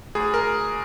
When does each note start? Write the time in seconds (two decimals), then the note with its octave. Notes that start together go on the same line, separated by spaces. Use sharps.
0.15 D2 G#4
0.34 A#4